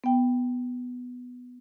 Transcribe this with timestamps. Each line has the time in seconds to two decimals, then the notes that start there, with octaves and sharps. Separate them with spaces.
0.04 B3 G5